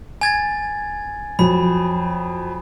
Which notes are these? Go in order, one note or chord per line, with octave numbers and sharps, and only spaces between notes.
G#5 G#6 A6
F2 F#3 B5